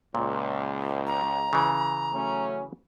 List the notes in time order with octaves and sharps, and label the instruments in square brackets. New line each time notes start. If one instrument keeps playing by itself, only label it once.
[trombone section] C#2 [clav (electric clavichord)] A#2
[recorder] A#5
[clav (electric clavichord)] C#3 E3
[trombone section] F#3 A3 C#4